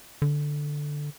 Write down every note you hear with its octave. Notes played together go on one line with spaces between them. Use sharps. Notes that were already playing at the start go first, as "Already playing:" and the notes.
D3